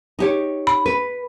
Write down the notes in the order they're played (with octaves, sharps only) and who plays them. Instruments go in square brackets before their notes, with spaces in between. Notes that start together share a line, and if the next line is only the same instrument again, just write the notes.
[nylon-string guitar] D#4 G4 C#5
[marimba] B5
[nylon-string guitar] B4